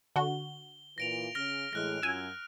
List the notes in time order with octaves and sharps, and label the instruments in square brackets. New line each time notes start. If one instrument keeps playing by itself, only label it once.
[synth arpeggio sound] D3 F#4 [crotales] G7
[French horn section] A#2 E3 [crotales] A#6 D7 F7
[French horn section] C#3 [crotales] F6 A#6
[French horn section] A2 E3 G#3 [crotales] F6 F#6 A#6
[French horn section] F#2 F4 [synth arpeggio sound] G#5 E6